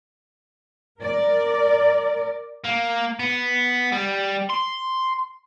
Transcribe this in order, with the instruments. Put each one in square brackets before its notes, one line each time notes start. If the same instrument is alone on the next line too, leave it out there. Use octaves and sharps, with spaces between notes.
[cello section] A#4 D5
[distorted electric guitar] A#3
B3
G3
C6